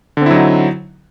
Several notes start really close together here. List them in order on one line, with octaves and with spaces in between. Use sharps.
D3 C4 E4 F#3 D#4